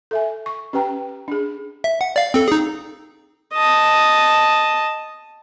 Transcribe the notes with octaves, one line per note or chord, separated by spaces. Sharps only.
A4 E5 G#5
C#6
C#4 G4 B4 G5 A#5
D4 G#4
E5
F#5
D5 F5
C4 A4
D#4 G#4
D#5 A5